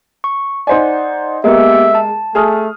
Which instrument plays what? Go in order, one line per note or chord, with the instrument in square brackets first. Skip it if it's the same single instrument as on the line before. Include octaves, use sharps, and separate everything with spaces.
[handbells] C#6
[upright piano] D#4 C5 G#5 [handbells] D5 F#5
[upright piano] G#3 A#4 [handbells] A#3 B3 G4 [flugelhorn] E5
[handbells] A5
[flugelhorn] A3 [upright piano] G#4 D#6 F6